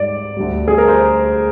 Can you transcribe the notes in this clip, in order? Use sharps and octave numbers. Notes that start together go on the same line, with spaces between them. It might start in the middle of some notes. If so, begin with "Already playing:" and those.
Already playing: G#2 G3 D5
D2 D3 G3
G#4
A#4
C5